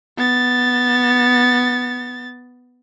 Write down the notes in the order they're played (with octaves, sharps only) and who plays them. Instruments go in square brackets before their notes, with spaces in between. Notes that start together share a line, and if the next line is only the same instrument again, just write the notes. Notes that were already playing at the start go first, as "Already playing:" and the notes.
[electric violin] B3 A6